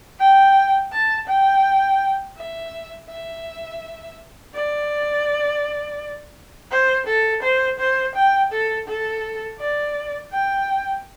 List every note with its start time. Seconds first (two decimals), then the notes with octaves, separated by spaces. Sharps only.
0.19 G5
0.92 A5
1.28 G5
2.37 E5
3.09 E5
4.54 D5
6.71 C5
7.07 A4
7.43 C5
7.79 C5
8.16 G5
8.52 A4
8.88 A4
9.60 D5
10.32 G5